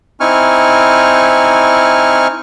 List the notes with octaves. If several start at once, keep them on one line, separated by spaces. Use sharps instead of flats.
C4 D#4 E4 G#5 C#6 F6